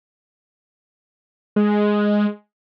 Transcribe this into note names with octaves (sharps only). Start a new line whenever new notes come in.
G#3